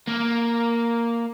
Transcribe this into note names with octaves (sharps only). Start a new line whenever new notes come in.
A#3